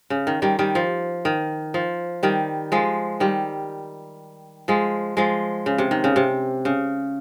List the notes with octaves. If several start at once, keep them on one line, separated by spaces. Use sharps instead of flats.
C#3
D#3
D#3 G3
D#3 G3
F3
D#3
F3
D#3 G3
F3 G#3
D#3 G3
F3 G#3
F3 G#3
C#3
C3
D#3
C#3
C3
C#3